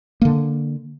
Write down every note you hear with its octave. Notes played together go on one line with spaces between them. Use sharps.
D3 A#3